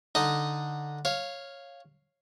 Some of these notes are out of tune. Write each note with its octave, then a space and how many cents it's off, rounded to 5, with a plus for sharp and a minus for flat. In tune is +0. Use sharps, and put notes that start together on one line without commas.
D3 +0 D#4 +0 D#5 +0
C#5 -10 F5 +0